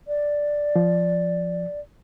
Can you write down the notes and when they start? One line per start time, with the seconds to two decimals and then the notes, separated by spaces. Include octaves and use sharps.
0.08 D5
0.76 F3